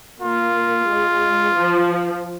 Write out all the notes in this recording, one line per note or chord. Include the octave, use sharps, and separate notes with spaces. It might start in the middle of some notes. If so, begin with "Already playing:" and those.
A#3 F4
G#3
F3